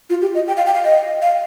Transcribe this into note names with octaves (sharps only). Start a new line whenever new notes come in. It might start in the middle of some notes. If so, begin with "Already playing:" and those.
F4
G4
D#5
G5
F5
G5
F5
D#5
F5